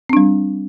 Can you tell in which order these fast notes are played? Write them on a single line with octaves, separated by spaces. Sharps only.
C4 D4 G3